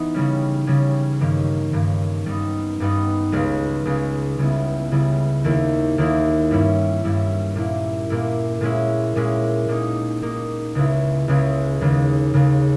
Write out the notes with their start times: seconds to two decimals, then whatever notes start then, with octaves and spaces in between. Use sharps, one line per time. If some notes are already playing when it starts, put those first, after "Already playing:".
Already playing: E3 B3 D#4
0.14 C#3 G3 C#4
0.67 C#3 G3 C#4
1.20 G2 D#3 A#3 C#4
1.73 G2 D#3 A#3 C#4
2.26 G2 G3 B3 D#4
2.80 G2 G3 B3 D#4
3.32 C#2 C#3 G#3 C#4
3.85 C#2 C#3 G#3 C#4
4.39 C#3 G3 B3 E4
4.92 C#3 G3 B3 E4
5.44 D#2 D#3 A#3 E4
5.98 D#2 D#3 A#3 E4
6.51 G2 G3 C#4 E4
7.04 G2 G3 C#4 E4
7.55 A#2 A#3 E4
8.10 A#2 A#3 E4
8.61 A#2 G#3 C#4 E4
9.16 A#2 G#3 C#4 E4
9.68 A#2 A#3 D#4
10.22 A#2 A#3 D#4
10.75 C#2 C#3 G#3 C#4 E4
11.28 C#2 C#3 G#3 C#4 E4
11.81 D#2 C#3 G#3
12.34 D#2 C#3 G#3